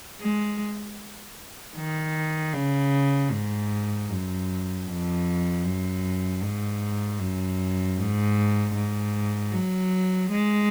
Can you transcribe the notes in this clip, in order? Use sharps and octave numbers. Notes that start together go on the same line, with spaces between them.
G#3
D#3
C#3
G#2
F#2
F2
F#2
G#2
F#2
G#2
G#2
F#3
G#3